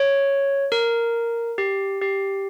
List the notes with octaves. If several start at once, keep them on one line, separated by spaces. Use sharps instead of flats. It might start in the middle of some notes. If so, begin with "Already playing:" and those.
Already playing: C#5
A#4
G4
G4